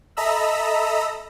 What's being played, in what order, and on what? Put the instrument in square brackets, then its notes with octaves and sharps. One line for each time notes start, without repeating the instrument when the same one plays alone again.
[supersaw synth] A4 D#5 E5 A#5 B5 E6